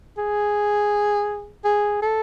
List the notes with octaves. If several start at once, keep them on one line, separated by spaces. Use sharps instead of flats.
G#4
G#4
A4